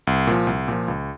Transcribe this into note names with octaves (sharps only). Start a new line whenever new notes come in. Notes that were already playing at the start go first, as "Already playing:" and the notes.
C2
A#2 F3
C2
A#2 F3
C#2